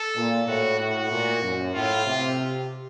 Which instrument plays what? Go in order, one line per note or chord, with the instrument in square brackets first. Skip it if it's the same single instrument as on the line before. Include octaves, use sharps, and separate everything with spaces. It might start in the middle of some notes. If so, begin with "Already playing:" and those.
Already playing: [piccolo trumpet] A4
[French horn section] A#2
[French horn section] A2 [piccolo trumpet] F#4
[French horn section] A2 [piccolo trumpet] F#4
[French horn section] A#2
F#2
[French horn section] A2 [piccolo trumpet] F4
[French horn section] C3